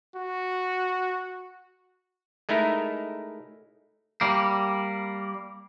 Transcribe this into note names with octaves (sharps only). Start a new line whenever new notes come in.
F#4
G#3 A3 D#4 E4 A#4
G3 A#3